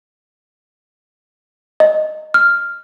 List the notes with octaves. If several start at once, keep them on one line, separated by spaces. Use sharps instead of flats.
D#5
F6